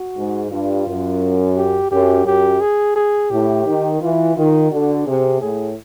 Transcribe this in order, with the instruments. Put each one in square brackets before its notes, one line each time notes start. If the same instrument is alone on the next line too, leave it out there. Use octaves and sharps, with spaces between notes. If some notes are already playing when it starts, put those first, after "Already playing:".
Already playing: [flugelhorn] F#4
[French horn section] G#2
[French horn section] G2 [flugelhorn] F4
[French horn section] F#2
[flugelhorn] G4
[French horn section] F#2 [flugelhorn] G4
[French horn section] F#2 [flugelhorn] G4
[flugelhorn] G#4
G#4
[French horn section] A2 [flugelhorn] G4
[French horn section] D#3
[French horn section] E3 [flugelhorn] F4
[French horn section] D#3 [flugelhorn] F4
[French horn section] D3 [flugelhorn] F#4
[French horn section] C3 [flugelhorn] G#4
[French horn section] A2 [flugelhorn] G#4